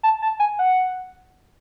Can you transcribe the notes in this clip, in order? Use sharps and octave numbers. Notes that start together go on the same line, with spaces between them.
A5
A5
G#5
F#5